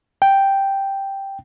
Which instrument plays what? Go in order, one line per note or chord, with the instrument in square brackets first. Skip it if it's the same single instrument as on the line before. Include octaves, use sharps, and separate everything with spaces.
[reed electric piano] G5